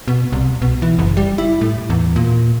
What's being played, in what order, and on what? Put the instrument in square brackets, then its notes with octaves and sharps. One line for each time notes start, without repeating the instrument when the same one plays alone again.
[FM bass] B2
C2
B2
E3
F#1
G3
E4
A2
E2
A#2